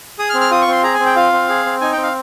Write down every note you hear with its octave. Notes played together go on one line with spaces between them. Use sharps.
G#4 D#6
F6
C4
F6
F4 D#6
C#6
C4 C6
G#4 A#5
G#5
C4
G5
F4 F5
C4
G#4
C4
D#4 G#5
C4 G5
F5